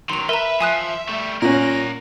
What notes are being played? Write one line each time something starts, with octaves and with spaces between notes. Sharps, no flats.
D#3 F#3 C6 F7
A#4 B4 E5 A#5
F3 G#5 D#6 F#6
G3 A3
A#2 C#4 A#4 F#5 A#6